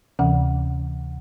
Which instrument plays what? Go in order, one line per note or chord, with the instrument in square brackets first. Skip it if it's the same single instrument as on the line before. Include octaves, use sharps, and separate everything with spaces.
[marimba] D2 C3 E3 C#4 F#5